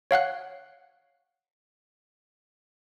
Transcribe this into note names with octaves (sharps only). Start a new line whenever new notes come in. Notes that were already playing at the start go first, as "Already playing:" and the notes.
C#5 F5 F#5 F#6